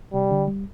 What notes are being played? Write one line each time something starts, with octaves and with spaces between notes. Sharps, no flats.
C3 G3
D3
G3